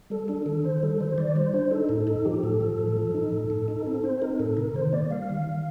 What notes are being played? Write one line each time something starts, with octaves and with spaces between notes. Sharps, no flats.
G3 A4
D4 A4
D#3 A4
D#3 C5
G3 A4
D#3 C5
D#3 D5
G3 C5
D4 C5
D#4 A4
A2 A4
D#4 A4
F3 G4
A2 A4
F3
A2
F3
D#4
A2
A2
D#4
C4 A4
C4 C5
D#4 A#4
A2 A4
C3 A#4
D#3 C5
A#3 D5
G3 F5
D#3
D#3